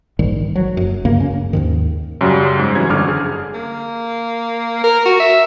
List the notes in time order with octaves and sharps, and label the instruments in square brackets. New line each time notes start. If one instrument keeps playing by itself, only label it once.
[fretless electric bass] A#1 G#2 D#3 G3
F#3
F#1 F#2
D2 G2 C#3 A#3
C#4
D#2 G#2 D#3
[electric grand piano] F#2 C#3 F#3 G3
G#2
E3 C#4 F#4 G#6
G1 F2 D3 D6 F6
G#4
[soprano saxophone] A#3
A#4
F#4
E5